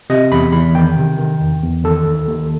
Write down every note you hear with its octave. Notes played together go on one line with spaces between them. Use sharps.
C3 D#5
E2 B5
E2 B5
D#3 G5
C3
D#3
E2
E2
D#3 A4
D#2
D#2